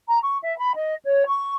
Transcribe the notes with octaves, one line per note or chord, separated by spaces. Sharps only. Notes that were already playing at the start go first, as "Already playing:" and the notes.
A#5
C#6
E5
B5
D#5
C#5
C#6